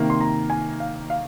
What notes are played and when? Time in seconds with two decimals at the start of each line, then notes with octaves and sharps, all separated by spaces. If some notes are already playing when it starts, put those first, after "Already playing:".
Already playing: C3 D#3 A#3
0.10 C6
0.21 A#5
0.50 G#5
0.80 F5
1.10 F5